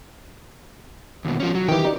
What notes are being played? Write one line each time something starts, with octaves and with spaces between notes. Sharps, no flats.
D#2 B2
F3 C#4
F#3
D#3 E3 G4 G5
D#4 D5